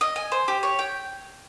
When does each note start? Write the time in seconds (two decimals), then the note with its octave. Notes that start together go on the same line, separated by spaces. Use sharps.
0.01 D#5
0.16 G#5
0.32 C5
0.48 G4
0.63 C#5
0.79 G5